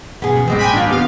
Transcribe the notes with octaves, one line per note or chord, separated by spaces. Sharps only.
B2 B3 G#4
E3 C#4
G2 G3 G#3 B3 C4
A1 G2 G5 G#5 B5
D#3 A#3 D4 F4
C#3 B3 C4 G4 F5